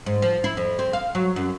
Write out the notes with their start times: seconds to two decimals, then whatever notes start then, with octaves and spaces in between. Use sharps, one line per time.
0.06 G#2
0.22 F3
0.44 E4
0.57 F2
0.79 C4
0.93 F5
1.15 F#3
1.36 F#2